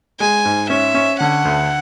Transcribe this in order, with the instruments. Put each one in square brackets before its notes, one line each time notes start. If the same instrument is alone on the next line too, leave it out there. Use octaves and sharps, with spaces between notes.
[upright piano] G#3 [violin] G#5
[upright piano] G#2
[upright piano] C#4 [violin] E5
[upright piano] C#4
[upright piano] D3 [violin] F#5
[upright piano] D2